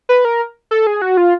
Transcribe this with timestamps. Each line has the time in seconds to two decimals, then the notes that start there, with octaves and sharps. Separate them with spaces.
0.09 B4
0.25 A#4
0.71 A4
0.87 G#4
1.02 F#4
1.17 F4